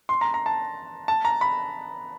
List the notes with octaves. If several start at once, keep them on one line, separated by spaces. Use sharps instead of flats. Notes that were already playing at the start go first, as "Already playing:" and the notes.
C6
A#5
A#5
A5
A5
A#5
B5